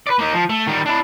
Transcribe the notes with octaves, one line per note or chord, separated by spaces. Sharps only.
B4 D5
A#3 D#4
F3
A3
D#3 G3
D4 E4